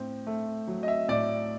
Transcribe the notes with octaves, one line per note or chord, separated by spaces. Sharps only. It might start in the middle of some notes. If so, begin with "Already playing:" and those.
Already playing: A2 C4
A3
F#3
D#5
E5
A2 D5